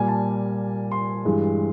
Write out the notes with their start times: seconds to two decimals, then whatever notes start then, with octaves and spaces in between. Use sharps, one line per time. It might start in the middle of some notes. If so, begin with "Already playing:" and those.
Already playing: A#2 G3 A#3 G#5
0.08 A5
0.91 C6
1.25 G2 E3 G#3